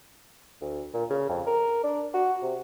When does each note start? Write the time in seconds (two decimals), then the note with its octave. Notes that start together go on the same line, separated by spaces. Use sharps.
0.61 D2
0.93 A#2
1.10 C#3
1.29 F2
1.47 A#4
1.83 D4
2.14 F#4
2.42 C3